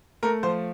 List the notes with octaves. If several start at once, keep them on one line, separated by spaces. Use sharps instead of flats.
A3 A#4
F3 C5